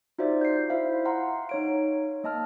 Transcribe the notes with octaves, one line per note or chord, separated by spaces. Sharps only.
D#4 F4 F#4 C5 D5 E5
G6 C7
E4 C5 E5 F5
F5 F#5 A#5 C6
D#4 C#5 D7
A#3 D#5 A5 F6